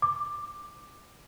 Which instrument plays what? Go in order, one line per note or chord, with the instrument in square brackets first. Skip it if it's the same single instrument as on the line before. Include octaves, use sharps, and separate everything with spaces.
[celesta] D6